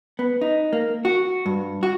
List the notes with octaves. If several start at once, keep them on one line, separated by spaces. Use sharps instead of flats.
B3
D#4
A#3
F#4
G2
F#4